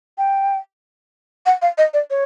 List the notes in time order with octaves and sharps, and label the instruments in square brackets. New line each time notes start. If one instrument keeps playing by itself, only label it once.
[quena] G5
F#5
F5
D#5
D5
C#5